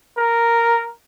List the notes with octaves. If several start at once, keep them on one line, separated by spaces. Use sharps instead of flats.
A#4